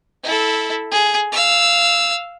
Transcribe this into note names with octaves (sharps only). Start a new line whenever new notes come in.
E4 A4
G#4
F5 E6